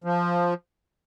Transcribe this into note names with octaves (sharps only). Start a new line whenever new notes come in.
F3